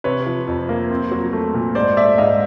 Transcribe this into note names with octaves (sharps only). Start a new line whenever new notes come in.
C3 B4 C#5
F3
F2
A#3
C4
F#3
A3
A#2
G#2 C5 D5
A3 D5 E5
G#2 D#5 F5